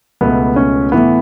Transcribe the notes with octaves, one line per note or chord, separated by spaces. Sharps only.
C#2 B2 A3 B3
C#4
A2 E3 A3 B3